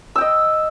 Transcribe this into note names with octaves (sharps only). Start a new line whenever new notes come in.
D#5 G5 E6